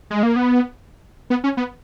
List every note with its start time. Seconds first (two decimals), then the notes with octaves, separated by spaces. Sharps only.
0.10 G#3
0.23 A#3
0.36 B3
1.30 B3
1.44 C#4
1.57 B3